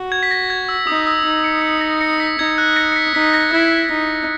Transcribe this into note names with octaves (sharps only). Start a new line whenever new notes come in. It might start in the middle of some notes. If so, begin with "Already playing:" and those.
Already playing: F#4
G#6
B6
A#6
G#6
E6
D#4 D#6
E6
D#4
C#7
C#7
A#6 C#7
A#6 C#7
B6
D#4 G#6
F#6
A#6 C#7
C#7
B6
D#4 B6
A#6
E4
D#4